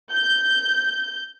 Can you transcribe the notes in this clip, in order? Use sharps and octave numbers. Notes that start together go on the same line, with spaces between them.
G6